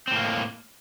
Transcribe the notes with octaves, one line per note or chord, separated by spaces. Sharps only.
A2 A#3 C4